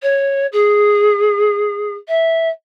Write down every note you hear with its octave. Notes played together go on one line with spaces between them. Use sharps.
C#5
G#4
E5